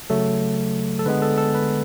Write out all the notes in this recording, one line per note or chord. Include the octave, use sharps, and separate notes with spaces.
C#3 F#3 A3 A4
A4
D3 G#3 B3 B4
A4
A4
B4